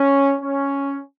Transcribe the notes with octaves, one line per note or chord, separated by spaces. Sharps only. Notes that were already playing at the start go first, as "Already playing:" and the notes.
Already playing: C#4
C#4